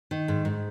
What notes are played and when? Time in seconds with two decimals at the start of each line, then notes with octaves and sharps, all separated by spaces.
0.11 D#3
0.28 G#2
0.45 G#2